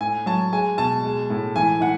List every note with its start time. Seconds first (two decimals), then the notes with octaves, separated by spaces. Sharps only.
0.01 A2 G#5
0.26 F#3 A5
0.53 G#3 G#5
0.77 B2 A5
1.03 G#3
1.30 A2
1.56 E3 G#5
1.81 E3 F#5